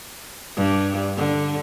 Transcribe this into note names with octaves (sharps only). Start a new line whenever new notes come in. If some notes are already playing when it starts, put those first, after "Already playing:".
G2
D3